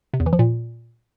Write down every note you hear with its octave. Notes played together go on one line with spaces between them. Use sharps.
C3
E2
E3
F3
A#2